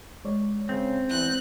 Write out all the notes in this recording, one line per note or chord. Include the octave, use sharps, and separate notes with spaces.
G#3 C#5 D5
C#3 C4
E2 F#6